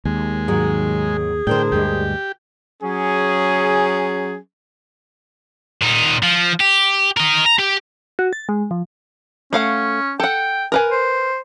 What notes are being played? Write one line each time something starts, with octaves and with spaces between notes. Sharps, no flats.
D#2 G#3
G#2 D#3 F#3 G#4
A2 D3 D4 A#4 C5 G5
D2 G2 G#3 G4
F#3 C#4 G#4
A#2 D#4
F3
G4
A#4 D#5
A#5
G4
F#4
A6
G#3
F3
A3 C#4 F5 F#5
A4 F#5 G5
A#4 B4 G#5
C5